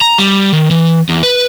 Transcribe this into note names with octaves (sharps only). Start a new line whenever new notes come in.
A#5
G3
D#3
E3
E2
B4